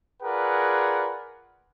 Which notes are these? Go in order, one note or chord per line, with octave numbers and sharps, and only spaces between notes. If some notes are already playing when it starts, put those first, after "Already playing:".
F4 G#4 A#4 B4 D5 F#5